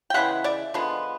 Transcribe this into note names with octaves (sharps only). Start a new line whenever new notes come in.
G5
C#3 E3 G#3 B3 E5 F#5
D5 E5
D3 F3 G#3 B3